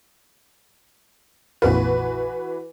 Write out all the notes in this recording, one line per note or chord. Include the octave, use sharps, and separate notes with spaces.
A#1 F2 E3 F4 F#4 B4